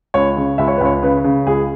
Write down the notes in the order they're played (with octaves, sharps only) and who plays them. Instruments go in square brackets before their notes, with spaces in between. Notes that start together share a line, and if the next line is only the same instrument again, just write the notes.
[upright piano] C#2 C#5
C#3
C#2 E5
C#5
B4
C#2 C#5
C#3 B4
C#3
C#2 G#4